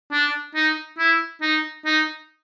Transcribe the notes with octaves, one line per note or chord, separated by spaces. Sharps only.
D4
D#4
E4
D#4
D#4